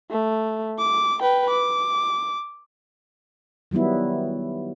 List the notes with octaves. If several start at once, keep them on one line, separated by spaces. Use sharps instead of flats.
A3
D6
B4 G5
D6
D#3 F#3 G3 B3 E4